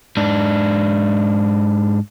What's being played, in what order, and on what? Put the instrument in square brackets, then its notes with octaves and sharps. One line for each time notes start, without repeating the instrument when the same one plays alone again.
[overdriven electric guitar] G#2 D4